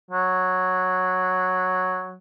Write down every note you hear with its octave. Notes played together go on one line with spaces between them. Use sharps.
F#3